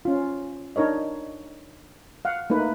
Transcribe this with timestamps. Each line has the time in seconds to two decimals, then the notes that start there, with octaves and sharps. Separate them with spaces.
0.05 C#4 F4
0.76 D4 D#4 A#4 C#5 D#5
2.25 F5 F#5
2.50 A3 A#3 D#4 B4